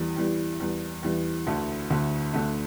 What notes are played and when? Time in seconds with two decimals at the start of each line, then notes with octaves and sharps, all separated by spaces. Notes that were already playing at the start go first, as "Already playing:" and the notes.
Already playing: E2 E3 G3
0.17 E2 E3 G3
0.60 E2 E3 G3
1.03 E2 E3 G3
1.47 D2 D3 A3
1.90 D2 D3 A3
2.33 D2 D3 A3